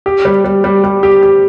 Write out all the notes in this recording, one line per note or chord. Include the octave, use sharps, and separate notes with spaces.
G4
G3
G3
G3
G3
G4
G4